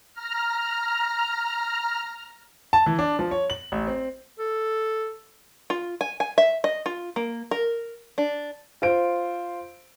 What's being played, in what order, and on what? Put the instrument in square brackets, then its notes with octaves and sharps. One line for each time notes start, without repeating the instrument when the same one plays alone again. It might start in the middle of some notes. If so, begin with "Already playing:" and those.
[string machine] A#5 F6
[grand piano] A5
E3
D4
F3
C#5
F#7
A1
C4
[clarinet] A4
[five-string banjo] F4
G#5
G#5
E5
D#5
F4
A#3
A#4
D4
[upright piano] F4 C5 D7